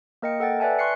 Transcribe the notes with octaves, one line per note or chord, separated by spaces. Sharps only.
A#3 A#4 D#5 G5 C#7
A4 F#5 G5 A6
B4 D5 E5 G#5 A5
C6 C#6 F#6 C7 C#7